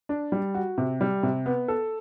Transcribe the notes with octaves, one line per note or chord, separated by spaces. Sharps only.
D4
G3
F#4
C3
G3
C3
B3
A4